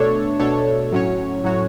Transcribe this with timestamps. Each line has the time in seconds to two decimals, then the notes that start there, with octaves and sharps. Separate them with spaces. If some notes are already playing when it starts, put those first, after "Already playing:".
Already playing: B2 A3 D4 A4 C#5
0.40 B2 A3 D4 A4 C#5
0.92 A2 F#3 C#4 F#4 C#5
1.44 A2 F#3 C#4 F#4 C#5